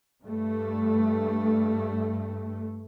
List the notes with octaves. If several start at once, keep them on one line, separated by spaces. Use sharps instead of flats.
G2 A3